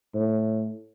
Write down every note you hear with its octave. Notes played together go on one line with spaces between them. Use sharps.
A2